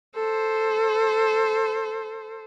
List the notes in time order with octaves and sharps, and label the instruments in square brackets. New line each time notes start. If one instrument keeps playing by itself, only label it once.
[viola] A4 C5